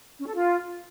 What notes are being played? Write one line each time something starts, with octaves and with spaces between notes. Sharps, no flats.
C#4
A4
F4